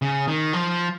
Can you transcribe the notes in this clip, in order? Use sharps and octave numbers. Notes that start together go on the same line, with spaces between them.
C#3
D#3
F3